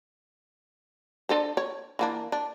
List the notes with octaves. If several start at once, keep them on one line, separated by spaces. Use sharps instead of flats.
D4 A4 C5
C#5
E3 A#3 D4
D4